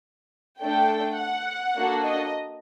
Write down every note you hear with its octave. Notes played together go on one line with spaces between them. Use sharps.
A3 D4 A4 G5
F#5
A#3 D4 F#4 A4
D#5